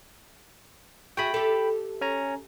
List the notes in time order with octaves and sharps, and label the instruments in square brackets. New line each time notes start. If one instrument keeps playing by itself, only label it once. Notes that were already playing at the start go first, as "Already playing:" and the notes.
[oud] F#4 G#4 E5 [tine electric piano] G5 B5
[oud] G4 A4
[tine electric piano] C#4 G#5 A#5